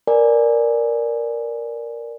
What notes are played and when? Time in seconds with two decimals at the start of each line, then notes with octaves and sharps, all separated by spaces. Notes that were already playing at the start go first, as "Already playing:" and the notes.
0.07 A#4 B4 D5 G#5